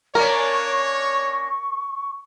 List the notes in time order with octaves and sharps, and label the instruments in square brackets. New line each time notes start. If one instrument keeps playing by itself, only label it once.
[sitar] A#3 C#4 D4 [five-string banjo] A#4 [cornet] C#5 [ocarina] C#6